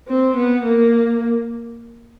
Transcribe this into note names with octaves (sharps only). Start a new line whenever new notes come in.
C4
B3
A#3